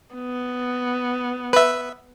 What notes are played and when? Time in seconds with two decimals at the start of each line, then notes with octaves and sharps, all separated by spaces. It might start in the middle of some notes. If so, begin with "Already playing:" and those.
0.15 B3
1.53 B4 E5